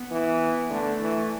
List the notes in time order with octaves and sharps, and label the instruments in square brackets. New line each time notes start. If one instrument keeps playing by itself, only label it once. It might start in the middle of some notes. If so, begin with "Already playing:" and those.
Already playing: [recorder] B3
[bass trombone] E3
[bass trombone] D3 [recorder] A3
[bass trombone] E3